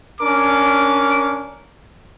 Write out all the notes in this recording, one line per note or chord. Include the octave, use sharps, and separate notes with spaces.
C#4 D4 A#4 D6